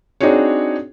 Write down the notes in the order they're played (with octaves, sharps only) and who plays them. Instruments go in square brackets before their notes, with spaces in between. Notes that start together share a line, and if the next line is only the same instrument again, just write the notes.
[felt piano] C4 D4 D#4 F#4 G#4 C#5